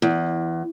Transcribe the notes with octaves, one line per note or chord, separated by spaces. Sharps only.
E2